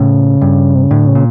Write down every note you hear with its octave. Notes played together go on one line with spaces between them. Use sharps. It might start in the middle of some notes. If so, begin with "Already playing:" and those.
Already playing: A2 C#3
G2
C3
C#3
A2 D3
C#3
A#2